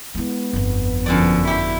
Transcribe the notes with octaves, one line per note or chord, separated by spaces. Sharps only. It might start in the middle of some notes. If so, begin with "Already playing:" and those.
G#3 B3 E4
G1 F2
F#2 D3 F3 D5
E4 G4